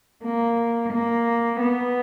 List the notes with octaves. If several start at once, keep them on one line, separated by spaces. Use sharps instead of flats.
A#3
A#3
B3